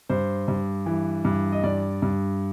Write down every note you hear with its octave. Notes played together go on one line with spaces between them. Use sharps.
G2 C5
G2
E3
G2
D#5
G2 D5
G2